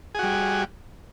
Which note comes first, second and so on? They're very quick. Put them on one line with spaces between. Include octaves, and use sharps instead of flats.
G#4 F#4 G3